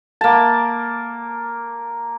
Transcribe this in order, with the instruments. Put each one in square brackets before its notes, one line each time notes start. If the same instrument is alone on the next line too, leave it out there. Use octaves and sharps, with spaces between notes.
[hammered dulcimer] A#3 A5